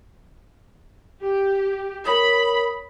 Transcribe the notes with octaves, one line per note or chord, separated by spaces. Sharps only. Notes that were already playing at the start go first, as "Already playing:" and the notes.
G4
A#4 C#5 B5 D#6